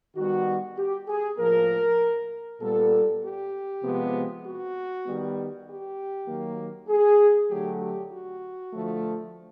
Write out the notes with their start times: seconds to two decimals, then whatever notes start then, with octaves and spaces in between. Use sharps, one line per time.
0.16 D#3 G3 B3 F#4
0.78 G4
1.08 G#4
1.38 A2 F3 A#3 A#4
2.61 A#2 G3 B3 A4
3.22 G4
3.83 C3 F3 G#3 B3
4.44 F#4
5.05 D#3 G3 B3
5.66 G4
6.28 D#3 F#3 A#3
6.89 G#4
7.50 D3 F#3 A3 G4
7.81 G4
8.12 F#4
8.72 D3 F3 A3